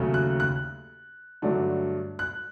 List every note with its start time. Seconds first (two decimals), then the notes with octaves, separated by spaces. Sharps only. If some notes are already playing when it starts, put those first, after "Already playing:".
Already playing: D#2 C#3 F#3 A3
0.14 F#6
0.40 F#6
1.42 G2 D3 F#3 A3 D4
2.19 F#6